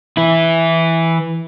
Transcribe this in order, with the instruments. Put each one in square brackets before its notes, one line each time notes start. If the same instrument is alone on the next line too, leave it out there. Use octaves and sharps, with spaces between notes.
[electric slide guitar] E3 E4